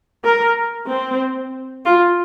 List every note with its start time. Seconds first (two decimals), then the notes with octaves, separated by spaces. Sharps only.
0.25 A#4
0.88 C4
1.85 F4